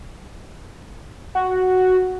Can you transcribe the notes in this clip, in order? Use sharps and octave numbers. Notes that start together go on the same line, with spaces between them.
F#4